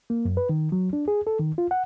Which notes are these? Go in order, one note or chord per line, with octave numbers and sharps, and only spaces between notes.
A#3
F#2
B4
D#3
F#3
D4
G#4
A4
D#3
F4
F#5